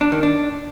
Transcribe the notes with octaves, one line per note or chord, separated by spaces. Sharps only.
D4
D#3
D4